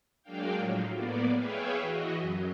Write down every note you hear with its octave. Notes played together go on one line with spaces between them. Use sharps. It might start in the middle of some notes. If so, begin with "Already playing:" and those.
F#3 G#3 A#3 D4 F5 G5
A2 F3 F#3
A2 A#3 B3 D5
G#4 B4 C#5 E5 F5 G5
E3 F#4 D#5
F#2 F#3